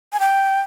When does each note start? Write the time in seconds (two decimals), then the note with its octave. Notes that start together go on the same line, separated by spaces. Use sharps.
0.13 G#5
0.20 G5